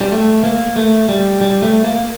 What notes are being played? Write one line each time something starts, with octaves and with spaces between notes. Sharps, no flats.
G3
A3
A#3
A3
G3
G3
A3
A#3